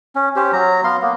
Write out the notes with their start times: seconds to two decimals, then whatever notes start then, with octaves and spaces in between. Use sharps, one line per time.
0.15 C#4
0.36 C#4 G4 C5
0.53 F#3 A#5
0.84 B3 F5 C6
1.02 A#3 B3